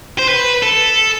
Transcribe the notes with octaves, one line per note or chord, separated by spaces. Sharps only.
C5
B4
A4